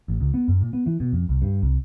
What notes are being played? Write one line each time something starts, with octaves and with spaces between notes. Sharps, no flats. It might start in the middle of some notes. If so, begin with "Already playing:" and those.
A1
C#2
B3
F#2
A#2
B3
E3
B2
F2
C2
G2
C2